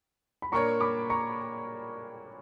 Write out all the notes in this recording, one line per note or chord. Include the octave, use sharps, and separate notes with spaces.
B5
A#2 A#3 D4 A#4 C#5 A#5 C#6
B5 D6
A#5 C#6